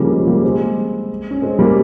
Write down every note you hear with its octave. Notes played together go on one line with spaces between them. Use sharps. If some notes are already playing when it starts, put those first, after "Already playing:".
Already playing: C#3 F3 G3 A#3
G#3 C4
G3 A#3
G#3 C4
C#4
G#3 C4
G3 A#3